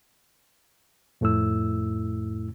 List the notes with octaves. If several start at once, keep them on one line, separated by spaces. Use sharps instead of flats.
F2 A2 A3 E4 E6